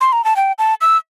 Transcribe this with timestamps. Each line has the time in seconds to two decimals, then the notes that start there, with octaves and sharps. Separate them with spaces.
0.01 C6
0.12 A#5
0.24 A5
0.36 G5
0.59 A5
0.81 E6